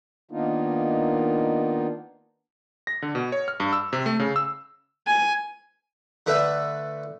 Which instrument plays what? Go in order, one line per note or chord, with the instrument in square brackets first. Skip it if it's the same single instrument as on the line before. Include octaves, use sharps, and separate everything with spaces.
[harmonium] D#3 A#3 B3 D4 D#4 F4
[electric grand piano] A#6
D3
B2
C#5
F6
G2
E6
C3
A3
C#3
E6
[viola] G#5
[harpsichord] D3 A3 B4 E5